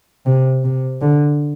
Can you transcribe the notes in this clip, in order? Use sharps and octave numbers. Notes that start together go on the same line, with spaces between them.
C3
C3
D3